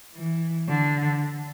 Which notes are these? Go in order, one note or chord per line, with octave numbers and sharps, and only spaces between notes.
E3
D3